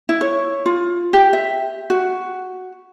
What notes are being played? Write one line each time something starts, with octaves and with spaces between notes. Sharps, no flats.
E4
C#5
F4
G4
E5
F#4